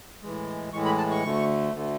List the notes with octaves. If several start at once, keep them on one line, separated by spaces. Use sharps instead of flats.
A2 E3 G#3
A2 E3 G#3 C#6
B5
A5
C#6
D2 D3 A3
D2 D3 A3